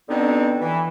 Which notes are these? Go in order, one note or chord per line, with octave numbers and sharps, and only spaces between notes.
B2 D3 B3 C4 D4 D#4
E3